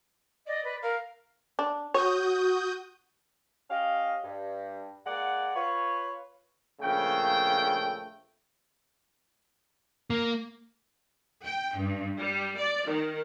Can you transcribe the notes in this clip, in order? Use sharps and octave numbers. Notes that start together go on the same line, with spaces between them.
D5 D#5
B4
A#4 F5
D4
F#4 C#5 D#6 G6
C#4 G4 D#5 F5
G2
G#3 A#3 D5 F#5
F4 B4 C#5
A#1 C#3 A3 G5
A#3
G5
G2
G3
D5
D#3